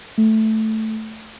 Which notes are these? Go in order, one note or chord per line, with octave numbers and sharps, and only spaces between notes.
A3